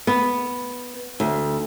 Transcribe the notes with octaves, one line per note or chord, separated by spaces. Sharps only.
B3
D2